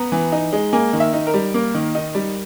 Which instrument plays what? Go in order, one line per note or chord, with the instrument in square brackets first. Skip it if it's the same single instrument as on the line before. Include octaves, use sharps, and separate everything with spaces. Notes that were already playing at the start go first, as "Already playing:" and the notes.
Already playing: [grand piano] B3 A#5
E3
D#4
G#3
A#3 G#5
D#3
E5
D#4
A#4
G3
A#3
D#3
D#4
G3